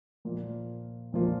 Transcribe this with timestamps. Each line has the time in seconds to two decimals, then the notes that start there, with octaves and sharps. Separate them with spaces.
0.25 A#2 F3 A#3 F4
1.13 A#2 F3 A#3 F4